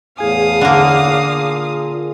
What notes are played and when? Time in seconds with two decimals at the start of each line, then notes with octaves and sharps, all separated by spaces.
0.18 E2 A2 G#4 F5 G#5 D#6
0.61 D3 A#3
1.02 A#2